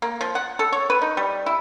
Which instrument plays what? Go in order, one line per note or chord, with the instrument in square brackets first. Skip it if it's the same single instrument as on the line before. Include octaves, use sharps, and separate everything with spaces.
[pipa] A#3
F3
F#5
A4
C#5
B4
D#4
G3
E4